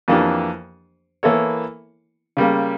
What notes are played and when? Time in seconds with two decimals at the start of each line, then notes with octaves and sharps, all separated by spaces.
0.08 F2 E3 A#3 D4 G4
1.23 E3 A#3 E4 A4 C#5
2.37 C#3 G3 A#3